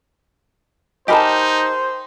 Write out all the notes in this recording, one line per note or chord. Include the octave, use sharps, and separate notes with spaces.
D#4 G4 A#4 C5 D#5 G#5 A5 B5